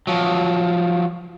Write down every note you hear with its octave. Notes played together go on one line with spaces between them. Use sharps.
F3 F#3